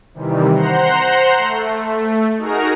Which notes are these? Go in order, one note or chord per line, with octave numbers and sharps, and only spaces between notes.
C3 D#3 E3 G3
C5 F#5 A#5 C6
A3
D#4 F#4 G#4 A#4 A#5